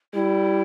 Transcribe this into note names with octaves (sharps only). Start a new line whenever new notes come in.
G3 E4